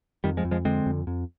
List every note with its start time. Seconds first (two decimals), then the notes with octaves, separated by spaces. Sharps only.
0.24 F2 D#3 G3
0.37 F3 G#3
0.45 F2
0.51 F3 G#3
0.65 D3 G#3 C4
0.86 F2
1.07 F2